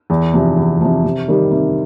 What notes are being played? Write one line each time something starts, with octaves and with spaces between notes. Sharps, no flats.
E2
C3 F3
E2
C3 F3
C3
D#3 G3
C3